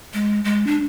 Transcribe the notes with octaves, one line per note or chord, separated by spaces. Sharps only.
G#3
G#3
D4